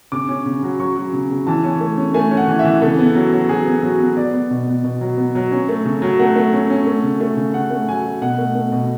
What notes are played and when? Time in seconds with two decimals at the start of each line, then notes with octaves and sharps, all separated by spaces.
0.12 C#3 D6
0.29 C#4
0.46 C#3
0.63 F#3
0.79 F#3 C#6
0.96 F#3
1.13 C#3
1.30 C#3
1.47 E3 A5
1.64 C#4
1.81 A3
1.98 C#4
2.14 A3 G#5
2.31 C#4
2.37 F#5
2.48 E3
2.59 E5
2.64 E3
2.82 C#3 A4
2.99 B3
3.15 F#3
3.33 F#3
3.49 F#3 G#4
3.66 B3
3.83 F#3 F#4
4.00 B3
4.17 B3 D5
4.34 B3
4.51 B2
4.67 B3
4.84 B2
5.01 F#3
5.17 B3
5.35 F#3
5.52 C#4
5.69 A3
5.85 C#3
6.02 F#3
6.19 A3 F#5
6.36 A3
6.53 C#4
6.70 C#4
6.87 A3
7.03 C#3
7.21 A3
7.37 C#3
7.54 C#3 F#5
7.71 A3
7.89 F#3 G#5
8.05 F#3
8.22 B2 F#5
8.38 A3
8.55 A3
8.72 B2